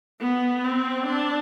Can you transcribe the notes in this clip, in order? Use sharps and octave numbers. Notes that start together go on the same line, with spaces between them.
B3
C4
D4